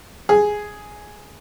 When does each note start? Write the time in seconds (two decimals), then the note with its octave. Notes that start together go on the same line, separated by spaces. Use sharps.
0.29 G#4